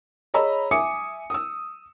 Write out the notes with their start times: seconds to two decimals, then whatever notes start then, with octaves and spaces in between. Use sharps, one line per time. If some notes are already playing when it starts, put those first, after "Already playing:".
0.34 G#4 C#5 D#5 A#5 B5 E6
0.71 E5 G#5 D6 D#6 C#7
1.30 D#6 E6